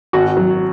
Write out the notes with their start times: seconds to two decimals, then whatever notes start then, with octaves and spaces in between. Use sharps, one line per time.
0.13 G#1 F#4
0.37 F#3